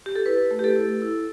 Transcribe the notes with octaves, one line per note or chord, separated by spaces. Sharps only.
G4
A4
E4 B4
A3
G4
A4
E4
E4